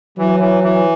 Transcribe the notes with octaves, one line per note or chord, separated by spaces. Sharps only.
E3 F#3
E3
E3